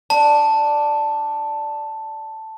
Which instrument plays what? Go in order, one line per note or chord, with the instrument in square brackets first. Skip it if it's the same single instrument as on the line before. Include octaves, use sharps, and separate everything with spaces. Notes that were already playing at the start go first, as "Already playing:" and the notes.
[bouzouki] D4 [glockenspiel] A5